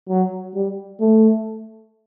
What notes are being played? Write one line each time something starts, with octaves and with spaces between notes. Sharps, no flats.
F#3
G3
A3